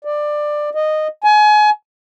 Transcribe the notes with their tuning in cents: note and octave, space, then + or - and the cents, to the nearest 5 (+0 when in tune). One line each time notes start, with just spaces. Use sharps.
D5 +15
D#5 -10
G#5 +30